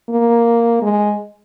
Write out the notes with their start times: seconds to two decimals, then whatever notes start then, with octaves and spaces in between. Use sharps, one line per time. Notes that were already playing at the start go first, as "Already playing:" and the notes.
0.10 A#3
0.82 G#3